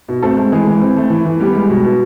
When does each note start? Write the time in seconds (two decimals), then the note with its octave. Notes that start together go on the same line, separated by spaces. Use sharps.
0.09 B2
0.23 A3 C4 A4
0.37 G#3
0.52 E3 G#3 G#4
0.67 E3
0.81 C4
0.97 A3
1.10 E3
1.25 E3
1.40 G3 B3 G4
1.55 G#3
1.69 B2
1.84 B2